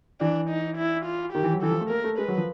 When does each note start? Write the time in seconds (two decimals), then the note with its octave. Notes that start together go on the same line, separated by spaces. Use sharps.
0.21 E3 D4
0.50 D#4
0.77 E4
1.06 F4
1.33 D#3 G4
1.43 E3
1.53 F#3
1.63 E3 A4
1.71 F3
1.81 A3
1.90 A#3 A#4
2.04 A3
2.18 G#3 B4
2.28 F#3
2.38 F3